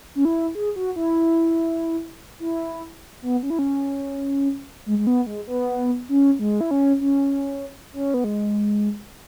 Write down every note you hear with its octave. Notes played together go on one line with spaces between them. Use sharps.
C#4
E4
G#4
F#4
E4
E4
B3
C#4
E4
C#4
G#3
G#3
B3
G#3
B3
C#4
G#3
E4
C#4
C#4
C#4
B3
G#3